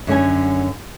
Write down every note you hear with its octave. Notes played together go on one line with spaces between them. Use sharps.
F#2 D3 C#4 G#5